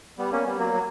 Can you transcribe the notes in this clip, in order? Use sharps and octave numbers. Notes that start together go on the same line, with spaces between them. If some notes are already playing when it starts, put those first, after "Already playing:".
G3 B3
A#3 C#4
G3 B3
F#3 A#3
F#3